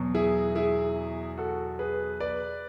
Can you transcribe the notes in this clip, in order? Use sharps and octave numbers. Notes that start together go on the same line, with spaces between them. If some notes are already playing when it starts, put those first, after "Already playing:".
Already playing: E2 B2 F#3
E4 G#4
E4 G#4
F#4 A4
G#4 B4
B4 D5